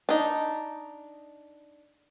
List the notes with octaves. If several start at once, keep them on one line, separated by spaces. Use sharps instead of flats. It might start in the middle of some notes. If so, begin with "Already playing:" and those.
D4 D#4